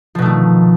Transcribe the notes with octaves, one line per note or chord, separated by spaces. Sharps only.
B2 D#3 F3 A3